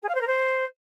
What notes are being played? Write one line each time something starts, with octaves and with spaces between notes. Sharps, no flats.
G#4
F5
C5
A#4
C5